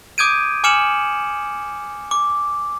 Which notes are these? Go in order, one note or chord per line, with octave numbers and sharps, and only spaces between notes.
D6 D#6 G6 G#6 D7 D#7
G#5 D6 F6 C#7 E7 F#7
D6